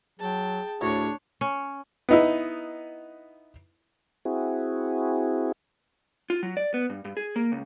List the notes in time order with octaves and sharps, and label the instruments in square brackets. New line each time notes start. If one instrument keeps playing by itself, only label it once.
[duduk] F#3 [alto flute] G#4 [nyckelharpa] G5 A5
[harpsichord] D2 A2 [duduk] D4 [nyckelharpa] C#5
[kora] C#4
[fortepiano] B3 D#4 E4
[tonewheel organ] C4 E4 F#4 G#4
[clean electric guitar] F4
F#3
D5
B3
G2
G2
G#4
A#3
C#2